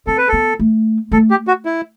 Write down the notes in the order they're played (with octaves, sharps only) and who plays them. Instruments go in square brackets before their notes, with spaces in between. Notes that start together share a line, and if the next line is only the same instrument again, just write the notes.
[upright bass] C4 [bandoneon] A4
[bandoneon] B4
[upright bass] B3 [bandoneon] A4
[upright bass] A3
[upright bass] A3 [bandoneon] A4
[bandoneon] G4
F#4
E4